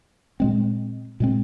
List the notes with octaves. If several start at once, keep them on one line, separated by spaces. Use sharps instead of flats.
A#2 G#3 C4
A#2 G#3 C4